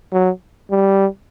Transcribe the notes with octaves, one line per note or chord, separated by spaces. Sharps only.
F#3
G3